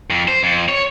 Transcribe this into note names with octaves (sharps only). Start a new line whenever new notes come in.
F2
C5
F2
C#5